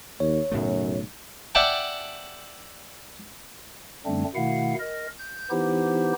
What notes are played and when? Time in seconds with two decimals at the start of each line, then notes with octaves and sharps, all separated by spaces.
0.20 D#2 C#5
0.52 B1 F#2 A2 C#3 A3
1.55 D5 E5 F#5 G5 A5
4.06 F#2 D3 G3 A3 C4 D4
4.35 B2 D#3 A3 E4 F5 F#5
4.80 A#4 D#5
5.18 G6
5.50 E3 B3 D#4 E4 G4 C5